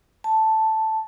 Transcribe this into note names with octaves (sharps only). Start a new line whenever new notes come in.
A5